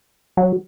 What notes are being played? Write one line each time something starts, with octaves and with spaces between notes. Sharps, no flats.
F#3